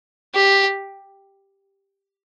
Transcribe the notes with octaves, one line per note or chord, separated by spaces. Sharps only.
G4